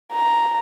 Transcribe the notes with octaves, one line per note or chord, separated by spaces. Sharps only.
A#5